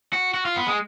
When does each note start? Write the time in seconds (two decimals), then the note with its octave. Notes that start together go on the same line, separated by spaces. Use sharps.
0.13 F#4
0.34 F#4
0.45 F4
0.56 B3
0.67 G#3